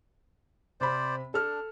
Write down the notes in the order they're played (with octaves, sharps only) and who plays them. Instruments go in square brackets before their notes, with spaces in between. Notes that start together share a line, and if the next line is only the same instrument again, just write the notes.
[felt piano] C3 C4 B5 [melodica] C5 D5
[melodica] D4 [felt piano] A4 F6